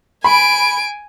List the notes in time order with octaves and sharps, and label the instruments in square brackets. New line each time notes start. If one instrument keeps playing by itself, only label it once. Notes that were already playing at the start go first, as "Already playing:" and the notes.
[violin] G#5 D7 [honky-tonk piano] B5